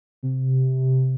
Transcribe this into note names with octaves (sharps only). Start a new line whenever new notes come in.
C3